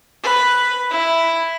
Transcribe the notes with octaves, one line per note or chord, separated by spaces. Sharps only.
B4
E4